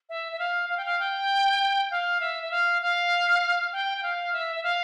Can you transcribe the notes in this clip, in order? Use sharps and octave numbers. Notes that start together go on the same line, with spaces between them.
E5
E5
F5
F5
G5
F5
G5
F5
E5
E5
F5
F5
G5
G5
F5
E5
E5
F5